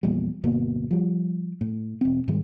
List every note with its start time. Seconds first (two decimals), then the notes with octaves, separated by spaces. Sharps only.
0.03 A#1 E2 A#2 G3
0.44 D1 G1 B2 A#3
0.91 F3 G3
1.61 A2
2.01 E1 C4
2.28 G#2 D#3 G3 G#3